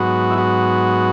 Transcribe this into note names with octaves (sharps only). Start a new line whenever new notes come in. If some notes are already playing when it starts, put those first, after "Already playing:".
Already playing: G#2 F#3 B3 F#4
E4
F#4